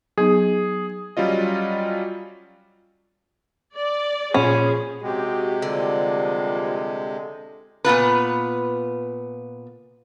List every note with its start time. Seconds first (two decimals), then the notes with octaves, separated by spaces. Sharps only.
0.18 F#3 B3 D#4 G#4
1.17 F#3 G3 C#4 F4 D#5
3.76 D5
4.34 A#2 F3 C#4 G#4 B5
5.02 C3 G#3 F#4 G4
5.62 D3 F3 G3 A#3
7.85 A#2 B3 F4 B4